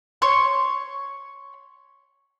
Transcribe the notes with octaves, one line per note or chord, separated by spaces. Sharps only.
C#5 C6 C#6